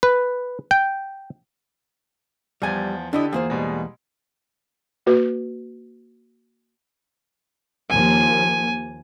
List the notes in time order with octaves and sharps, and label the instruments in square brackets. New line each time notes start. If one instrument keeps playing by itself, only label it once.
[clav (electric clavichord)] B4
G5
[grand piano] E2 F3 G#6 [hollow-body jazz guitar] G3 G#5
[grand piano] D3 G4 A4 [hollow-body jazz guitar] D4 E4 D#5
[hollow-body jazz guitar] E2 A#3 C5 [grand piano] F4 G#4
[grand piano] B2 G3 G#3
[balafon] A#3 F#4 B4
[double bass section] D#2 F3 A#3 [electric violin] G#5